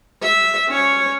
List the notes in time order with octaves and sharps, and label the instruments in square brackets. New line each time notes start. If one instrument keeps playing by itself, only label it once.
[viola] E5
C#4 C#5